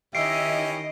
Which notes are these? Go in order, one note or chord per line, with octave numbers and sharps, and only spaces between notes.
D#3 C#4 E4 G4 D#5 E5 C7 D7